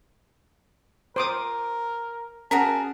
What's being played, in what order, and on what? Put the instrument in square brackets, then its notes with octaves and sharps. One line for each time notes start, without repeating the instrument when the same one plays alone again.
[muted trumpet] A#4 [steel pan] C5 D6 D#6
[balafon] C#4 [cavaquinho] F#4 G#4 A#4 [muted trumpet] A5